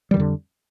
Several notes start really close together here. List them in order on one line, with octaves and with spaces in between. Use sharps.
G3 D#3 F2 D3